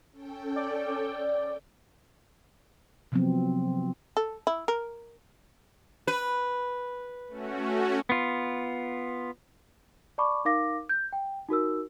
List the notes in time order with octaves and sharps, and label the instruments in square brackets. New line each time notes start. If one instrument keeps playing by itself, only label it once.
[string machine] C#4 A4 G5
[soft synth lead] D5
[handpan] C3 F3 F#3 B3 C4
[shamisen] A4
E4
A#4
[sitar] B4
[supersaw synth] A3 C#4 F#4
[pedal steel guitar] B3 F4
[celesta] D5 A5 B5 C#6 D6
D#4 A#4 F5 D6 A#6
G6
G5
D#4 F#4 A#4 E6